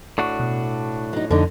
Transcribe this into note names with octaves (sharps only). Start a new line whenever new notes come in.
A2 D4 F#4 C#6
B2
F#3 D#4
F2 D3 D#4